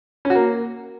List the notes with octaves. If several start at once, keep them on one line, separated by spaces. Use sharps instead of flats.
C#4
F#4
A#3